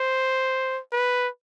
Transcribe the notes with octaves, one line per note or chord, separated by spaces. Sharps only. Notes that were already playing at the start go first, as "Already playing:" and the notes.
Already playing: C5
B4